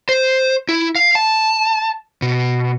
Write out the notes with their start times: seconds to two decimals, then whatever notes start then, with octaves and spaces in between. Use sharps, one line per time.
0.09 C5
0.69 E4
0.96 F5
1.15 A5
2.22 B2